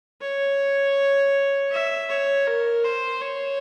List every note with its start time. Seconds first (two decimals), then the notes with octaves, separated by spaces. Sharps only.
0.21 C#5
1.72 E5
2.10 C#5
2.47 A#4
2.84 C5
3.22 C#5